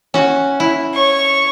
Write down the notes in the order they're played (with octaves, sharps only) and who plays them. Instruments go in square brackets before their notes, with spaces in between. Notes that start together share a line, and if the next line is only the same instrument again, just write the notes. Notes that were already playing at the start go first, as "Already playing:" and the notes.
[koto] C#4 F#4
E4
[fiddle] C#5 C#6